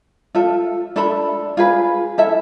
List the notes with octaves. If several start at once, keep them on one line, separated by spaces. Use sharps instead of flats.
F4 A4 E5
D4 A4 E5 B5
F4 G#4 B4
E4 A4 E5